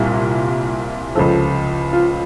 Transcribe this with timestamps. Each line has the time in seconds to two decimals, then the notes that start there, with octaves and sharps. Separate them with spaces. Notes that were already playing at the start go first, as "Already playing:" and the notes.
Already playing: C2 A#2 G3
1.15 C#2 C#3 F3 A4
1.93 F4